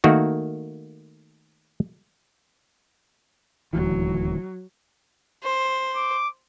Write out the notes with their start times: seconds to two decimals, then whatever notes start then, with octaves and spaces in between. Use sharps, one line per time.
0.04 D#3 A3 A#3 F#4
3.73 D#1 D2 E3 F#3
5.44 C5
5.96 D6